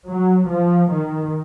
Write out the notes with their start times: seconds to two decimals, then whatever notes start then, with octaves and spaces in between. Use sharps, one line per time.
0.09 F#3
0.50 F3
0.92 D#3